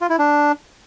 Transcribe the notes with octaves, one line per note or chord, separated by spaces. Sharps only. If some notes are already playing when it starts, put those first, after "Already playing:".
F4
E4
D4